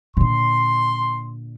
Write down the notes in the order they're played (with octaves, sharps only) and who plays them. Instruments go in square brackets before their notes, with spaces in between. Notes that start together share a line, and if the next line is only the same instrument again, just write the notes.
[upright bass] A#2 D3 [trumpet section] C6